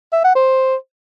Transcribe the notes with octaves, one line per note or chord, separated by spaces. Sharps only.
E5
F#5
C5